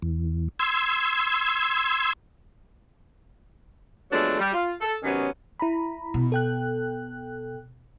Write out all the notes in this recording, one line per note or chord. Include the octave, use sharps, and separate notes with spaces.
E2
C6 E6 G#6
F2 F#3 G#3 A3 B3 D4
G3
F4
A4
C3 D#3 F#3 B3 C#4
E4 A#5 B5
B2
A4 G5 F#6